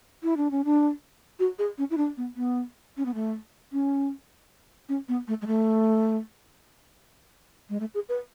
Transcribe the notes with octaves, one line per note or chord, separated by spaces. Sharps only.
E4
D4
C#4
D4
F#4
G#4
C#4
E4
D4
B3
B3
C#4
B3
A3
C#4
C#4
B3
A3
G#3
A3
G#3
A3
G#4
B4